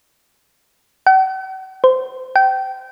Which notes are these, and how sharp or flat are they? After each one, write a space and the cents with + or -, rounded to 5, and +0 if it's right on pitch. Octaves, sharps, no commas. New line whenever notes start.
F#5 +45
C5 -25
G5 -25